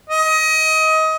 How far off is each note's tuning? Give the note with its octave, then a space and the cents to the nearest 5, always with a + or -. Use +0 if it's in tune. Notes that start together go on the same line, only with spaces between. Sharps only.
D#5 +25